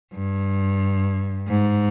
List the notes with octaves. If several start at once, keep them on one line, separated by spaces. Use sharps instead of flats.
G2
G#2